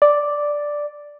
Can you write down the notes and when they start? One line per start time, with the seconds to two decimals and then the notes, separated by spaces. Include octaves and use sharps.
0.02 D5